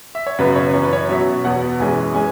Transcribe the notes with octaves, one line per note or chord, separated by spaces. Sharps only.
E5
C#5
F#2 C#3 F#3 B3 B4
C#5
F#2 E3 C#4 C#5
B4
C#5
B2 F#3 C#4 E5
E2 B2 B3 F#5
F#2 E3 G#3 C#4 G#5
G#3 C#4 G#5